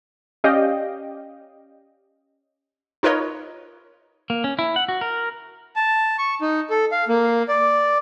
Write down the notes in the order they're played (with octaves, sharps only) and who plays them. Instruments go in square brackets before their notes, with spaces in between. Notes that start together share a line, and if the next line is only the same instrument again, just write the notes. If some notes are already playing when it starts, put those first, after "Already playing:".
[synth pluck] C#4 G4 D5 D#5 F5 G5
[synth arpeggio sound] D#4 F4 A#4 B4 C#5 D#5
[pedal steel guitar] A#3
C#4
E4
F#5
F#4
A#4
[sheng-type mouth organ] A5
C#6
D#4
A4
F5
A#3
D5